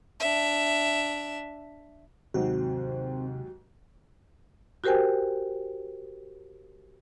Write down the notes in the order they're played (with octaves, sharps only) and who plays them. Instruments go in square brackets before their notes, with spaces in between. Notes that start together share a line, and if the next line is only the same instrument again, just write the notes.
[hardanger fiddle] D4 E5
[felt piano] D#2 G#2 F#3 [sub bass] C3 [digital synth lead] C4 [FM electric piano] F#4
[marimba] F#4 G4 A#4 C5 G5 G#5